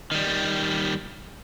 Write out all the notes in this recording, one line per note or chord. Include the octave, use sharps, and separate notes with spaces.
D#3 G3